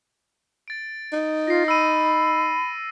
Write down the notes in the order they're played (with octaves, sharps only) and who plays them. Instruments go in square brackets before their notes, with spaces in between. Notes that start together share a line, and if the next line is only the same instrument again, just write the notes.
[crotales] A6 D7
[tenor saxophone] D#4
[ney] F4 [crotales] A#6 C7
[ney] B5 [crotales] E6 D#7